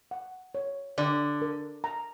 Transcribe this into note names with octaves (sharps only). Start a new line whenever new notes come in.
F#5
C#5
D3 D5
A#4
A#5